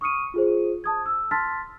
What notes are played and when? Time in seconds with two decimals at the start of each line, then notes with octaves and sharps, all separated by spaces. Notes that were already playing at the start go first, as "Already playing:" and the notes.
0.01 C#6 D#6 F6 C#7 D#7
0.34 F4 G#4 C5
0.84 A5 D#6 G#6
1.06 E6
1.31 A5 C6 F6 A6 B6